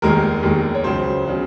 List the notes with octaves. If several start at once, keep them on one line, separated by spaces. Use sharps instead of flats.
F1 D#2 D#3 G#3 A#4
F1 D#2 D#3 G#3
C#5
C#2 C#3 F#3 C5
C#3 F#3